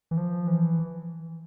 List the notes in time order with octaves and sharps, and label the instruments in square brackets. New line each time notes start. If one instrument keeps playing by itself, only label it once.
[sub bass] E3
F3
E3